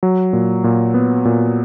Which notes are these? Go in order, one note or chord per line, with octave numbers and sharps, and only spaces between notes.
F#3
A#2
A#2
B3
A#2